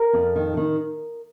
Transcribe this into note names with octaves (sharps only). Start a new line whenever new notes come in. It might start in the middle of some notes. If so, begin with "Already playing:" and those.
Already playing: A#4
F2
D#3
D#3